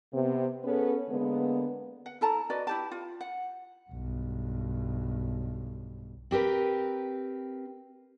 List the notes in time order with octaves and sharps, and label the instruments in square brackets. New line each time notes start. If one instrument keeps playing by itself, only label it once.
[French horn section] C3 B3
B3 C#4 G#4 A4 B4 C#5
D3 G#3 A#3 B3
[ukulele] F#5
E4 A4 A5 A#5
F#4 B4 D5 D#5
E4 G4 A5
F4
F#5
[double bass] B1 G2
[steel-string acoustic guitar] C4 G4 A#4 B4